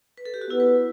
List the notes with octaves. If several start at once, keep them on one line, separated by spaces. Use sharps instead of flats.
B4
A4
G4
F#4
B3 E4
B4